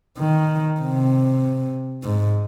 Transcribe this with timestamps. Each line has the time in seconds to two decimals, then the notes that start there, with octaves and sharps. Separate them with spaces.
0.18 D#3
0.80 C3
2.03 G#2